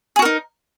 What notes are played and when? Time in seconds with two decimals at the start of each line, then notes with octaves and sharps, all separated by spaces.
0.16 G#4
0.19 F#4
0.22 A#4
0.25 D#4